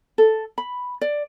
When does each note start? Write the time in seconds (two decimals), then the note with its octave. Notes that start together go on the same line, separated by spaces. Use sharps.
0.18 A4
0.58 B5
1.01 D5